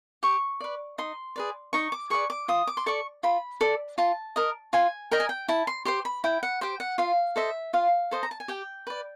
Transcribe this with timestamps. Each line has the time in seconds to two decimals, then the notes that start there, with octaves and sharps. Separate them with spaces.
0.23 G4 C#6
0.61 B4 D5
0.98 D#4 C6
1.36 G#4 B4 D5
1.73 D#4 C#6
1.92 D6
2.10 G#4 B4 D5 C#6
2.30 D6
2.48 F4 D#6
2.67 D6
2.77 C6
2.86 A4 D5 C#6
3.23 F4 B5
3.61 A4 D5
3.98 F4 A5
4.36 A#4 D#5
4.73 F4 G#5
5.11 A#4 D#5 G5
5.20 G#5
5.29 G5
5.48 E4 A5
5.67 C6
5.85 G4 C5 C6
6.05 B5
6.24 E4 G5
6.43 F#5
6.61 G4 C5 G5
6.80 F#5
6.98 F4 F5
7.36 A4 C5 D#5 E5
7.73 F4 F5
8.11 A4 C5 D#5
8.23 A#5
8.31 A5
8.40 G#5
8.48 G4 G5
8.87 B4 D5